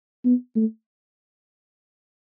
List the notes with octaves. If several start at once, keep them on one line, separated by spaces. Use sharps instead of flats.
B3
A3